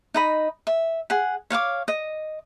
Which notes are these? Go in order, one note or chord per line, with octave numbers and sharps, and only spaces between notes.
D#4 D#5 B5
E5
G#4 F#5
C#5 F5 F#5 D6
D#5